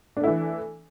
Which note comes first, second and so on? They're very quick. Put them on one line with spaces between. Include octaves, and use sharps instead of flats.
D4 A3 E4 E3